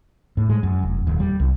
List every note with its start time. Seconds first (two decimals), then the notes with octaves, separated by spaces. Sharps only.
0.37 A2
0.50 G#3
0.63 F#2
0.83 F1
1.07 D#1
1.20 G3
1.40 C2